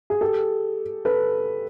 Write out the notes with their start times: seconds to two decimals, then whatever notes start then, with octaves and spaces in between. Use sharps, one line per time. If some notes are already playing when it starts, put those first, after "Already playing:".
0.10 G#4
0.21 G4 A4
1.05 A4 B4